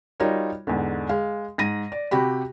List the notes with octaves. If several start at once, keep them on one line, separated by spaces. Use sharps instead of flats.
G3 D#4 F4 F#4 A#4 C#5
E2 G#2 D3
G#3 F5
G#2 A#6 D#7
D5
C3 F#4 G4 B5